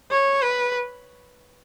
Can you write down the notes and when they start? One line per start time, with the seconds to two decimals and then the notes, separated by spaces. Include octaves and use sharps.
0.11 C#5
0.42 B4